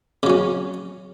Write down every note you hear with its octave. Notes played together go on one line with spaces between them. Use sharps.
C#3 F#3 C#4